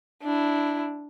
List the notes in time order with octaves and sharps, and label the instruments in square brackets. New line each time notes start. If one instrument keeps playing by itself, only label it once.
[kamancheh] D4 E4